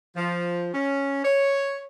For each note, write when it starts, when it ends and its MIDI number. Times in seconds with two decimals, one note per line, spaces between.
0.16 0.69 53
0.74 1.23 61
1.24 1.83 73